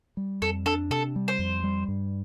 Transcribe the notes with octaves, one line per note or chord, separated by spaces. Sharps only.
G3
F2 A4
D4 A4
C3 A4
G3
C5
F2
G3
G2